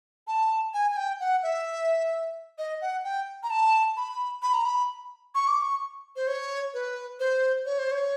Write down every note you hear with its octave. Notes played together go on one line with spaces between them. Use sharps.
A5
G#5
G#5
G5
F#5
E5
D#5
F#5
G5
A#5
A5
B5
B5
A#5
B5
C#6
D6
C#6
C5
C#5
B4
C5
C#5
C5
C#5